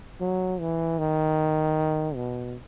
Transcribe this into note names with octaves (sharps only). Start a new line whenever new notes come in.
F#3
E3
D#3
B2